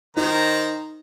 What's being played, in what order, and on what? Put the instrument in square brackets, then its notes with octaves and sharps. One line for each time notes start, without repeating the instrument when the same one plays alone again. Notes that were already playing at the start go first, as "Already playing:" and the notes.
[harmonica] D#3 C5 A#5 [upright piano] D#4